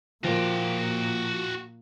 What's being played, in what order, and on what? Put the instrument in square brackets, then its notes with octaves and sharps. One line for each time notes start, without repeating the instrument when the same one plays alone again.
[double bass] A#2 [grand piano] F3 A#3 [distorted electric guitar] F#4 G5